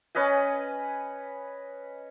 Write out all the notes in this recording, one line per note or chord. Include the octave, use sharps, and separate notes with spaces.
C#4 B4 D#5 G#5